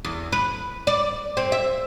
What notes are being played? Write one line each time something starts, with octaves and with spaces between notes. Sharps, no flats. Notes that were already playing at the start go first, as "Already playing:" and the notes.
E2
B4
D5
C4
E5